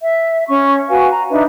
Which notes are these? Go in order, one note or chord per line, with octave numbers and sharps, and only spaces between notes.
E5
C#4 C#6
F#4 B4 F5 G#5
A#5
D4 D#4 B4 E5